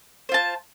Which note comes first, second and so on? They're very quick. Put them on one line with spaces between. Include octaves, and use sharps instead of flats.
C5 F4 A5